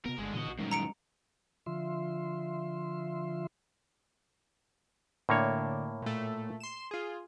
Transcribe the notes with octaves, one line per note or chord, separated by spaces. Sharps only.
C3 B3 A#4
G1 D3 G#3
A#2 D3 E3 F#4 D#5
A#1
F#2 A#2 D#3 G3 G#3
A#5 C#7 D7
D3 F3 F4 E5 C6
A2 D3 A#3 D4 C#5
A#2 A3
C6 E7
F4 G#4